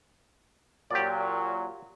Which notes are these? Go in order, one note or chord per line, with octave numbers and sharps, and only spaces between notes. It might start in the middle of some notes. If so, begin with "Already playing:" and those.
A#2 F#3 G4 D5